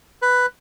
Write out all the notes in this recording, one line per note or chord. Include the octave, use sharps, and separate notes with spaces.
B4